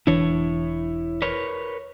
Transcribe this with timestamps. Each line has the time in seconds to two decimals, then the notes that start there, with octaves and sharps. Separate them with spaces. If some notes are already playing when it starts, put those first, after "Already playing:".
0.07 E1 E3 D4 E4 C#5
1.22 A#4 B4 C#5